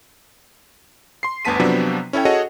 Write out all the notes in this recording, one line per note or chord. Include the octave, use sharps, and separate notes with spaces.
C6 C7
G1 D2 B3 A5 B6 D#7
C3 F3 F#3 B3 C4 D4
C#4 E4 A4 C#5 G5
F#4 G#4 A4 C#5 D#5 F#5